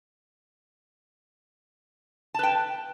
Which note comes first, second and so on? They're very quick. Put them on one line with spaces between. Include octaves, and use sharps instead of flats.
A5 B4 G5